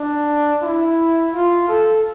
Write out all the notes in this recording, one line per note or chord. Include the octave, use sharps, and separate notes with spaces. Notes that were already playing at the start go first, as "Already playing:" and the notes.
Already playing: D4
E4
F4
A4